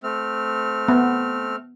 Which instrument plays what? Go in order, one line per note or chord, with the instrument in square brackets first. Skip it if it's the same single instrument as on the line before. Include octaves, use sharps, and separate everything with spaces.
[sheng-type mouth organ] A3 C4 F6
[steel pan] B3